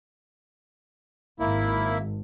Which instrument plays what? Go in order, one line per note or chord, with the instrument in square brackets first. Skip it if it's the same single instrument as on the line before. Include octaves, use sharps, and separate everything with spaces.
[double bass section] G#1 [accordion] A#3 E4